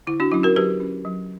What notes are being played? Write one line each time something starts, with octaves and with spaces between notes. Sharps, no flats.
D3 E4
D4 F#4
F#3 C#4 E4
F#4 A#4
F#3 G4 B4
C#4
F#3